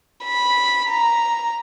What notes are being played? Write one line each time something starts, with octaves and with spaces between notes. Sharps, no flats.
B5
A#5